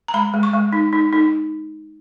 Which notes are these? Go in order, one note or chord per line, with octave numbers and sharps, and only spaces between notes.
A#5
G#3 B5
G#3
C#6
G#3
D#4
D#4
D#4